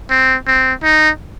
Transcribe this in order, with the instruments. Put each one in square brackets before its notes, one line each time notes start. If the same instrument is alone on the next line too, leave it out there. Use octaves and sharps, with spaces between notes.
[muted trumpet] C4
C4
D#4